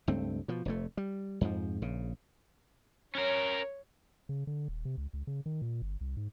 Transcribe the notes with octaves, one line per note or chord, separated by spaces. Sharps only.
C#2 G2 A3 C4
B2 F3
F1 F2 A3
G3
F2 G#2 F3
A#1 C#3
C#4 A#4 C#5
C#3
D3
D#1
C3
C#2
C#2
C#3
D#3
A#2
G1
C2
G#2